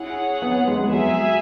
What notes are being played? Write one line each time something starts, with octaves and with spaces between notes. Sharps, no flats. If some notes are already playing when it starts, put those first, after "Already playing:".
Already playing: E4 G#4 C#5 F#5
B3
G#3
B3
G#3
F#3 G#4 E5 G#5